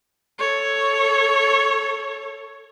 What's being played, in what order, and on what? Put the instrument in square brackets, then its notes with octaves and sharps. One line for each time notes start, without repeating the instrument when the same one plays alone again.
[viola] A4 C#5